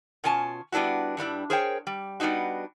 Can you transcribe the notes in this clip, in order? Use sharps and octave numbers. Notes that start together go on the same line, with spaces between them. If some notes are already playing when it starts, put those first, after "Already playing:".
B2 C#4 F4 G#5 A5
G3 B3 D4 E4 F#4
G2 G3 D4 E4
G#4 A#4 C5 C#5 F#5 G5
G3
G3 B3 D4 D#4 F#4